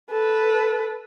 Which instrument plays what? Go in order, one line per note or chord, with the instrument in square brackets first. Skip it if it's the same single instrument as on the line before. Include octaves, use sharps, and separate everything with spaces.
[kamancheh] A4 B4